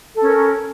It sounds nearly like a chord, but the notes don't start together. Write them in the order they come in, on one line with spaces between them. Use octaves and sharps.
A4 C#4 A#4